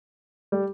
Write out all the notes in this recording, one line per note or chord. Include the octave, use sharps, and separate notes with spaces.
G3